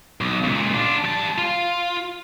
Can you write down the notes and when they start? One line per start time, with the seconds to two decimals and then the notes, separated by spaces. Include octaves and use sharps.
0.21 B1
0.44 C#2 A#2
0.74 D4 F4
1.05 G3 A5
1.38 F4